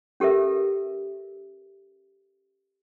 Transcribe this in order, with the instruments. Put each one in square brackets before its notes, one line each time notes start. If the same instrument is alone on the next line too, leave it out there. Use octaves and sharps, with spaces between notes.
[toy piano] C#4 G4 A4 A#4 E5